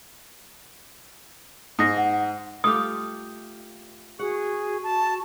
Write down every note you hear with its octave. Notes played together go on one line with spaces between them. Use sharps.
G#2 D#6 A#6
F#5
A3 F4 G4 D#6
F#4 G#4 F#5
A5